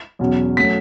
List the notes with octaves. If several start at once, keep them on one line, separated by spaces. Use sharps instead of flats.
E2 B2 F#3 C#4
F#3 A3 C#4 B6